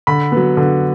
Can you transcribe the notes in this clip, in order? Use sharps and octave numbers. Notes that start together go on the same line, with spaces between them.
D3 B5
F#3 B3
D3